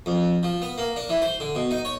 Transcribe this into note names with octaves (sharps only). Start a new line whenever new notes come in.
F2
F3
B3
A#3
D4
E3
C5
D3
B2
D#4
C#5